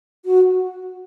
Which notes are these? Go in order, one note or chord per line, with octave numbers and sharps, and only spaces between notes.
F#4